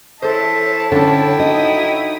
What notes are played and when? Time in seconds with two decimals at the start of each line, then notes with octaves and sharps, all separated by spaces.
0.22 E3 A4 C5 C#5 E5 A5
0.92 D3 C#4 D4 E4 A4 G5
1.39 D#4 F#4 D#5 D#6